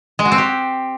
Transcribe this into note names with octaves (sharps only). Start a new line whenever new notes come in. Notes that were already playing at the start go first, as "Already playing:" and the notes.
G#3
F#4
C4
G4